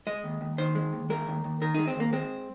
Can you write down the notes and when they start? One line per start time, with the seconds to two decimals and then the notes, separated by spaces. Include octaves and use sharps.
0.07 G#3 D#5
0.24 D#2
0.41 D#2
0.58 D#3 C5
0.75 G#3
0.93 D#2
1.10 G#3 A#4
1.27 D#2
1.44 D#2
1.61 D#3 A#4
1.74 G#3 D#4
1.87 C4
1.96 D#2 A#3
2.13 G#3 C4